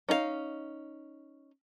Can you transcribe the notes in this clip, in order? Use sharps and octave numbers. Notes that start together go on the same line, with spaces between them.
C#4 D#4 E4 F5